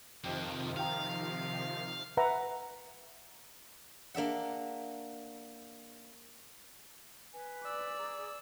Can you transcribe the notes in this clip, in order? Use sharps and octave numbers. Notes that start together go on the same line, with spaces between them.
F2 C3 D#3 F3 G4 C5 D#5
C5 F5 G5 A#5
B4 E5 F#5 A#5
A#3 D4 E5 F#5
B4 G#5
D5 E6
G#4 A#5